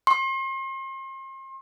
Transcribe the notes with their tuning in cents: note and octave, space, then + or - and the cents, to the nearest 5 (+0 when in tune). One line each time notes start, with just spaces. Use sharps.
C6 +40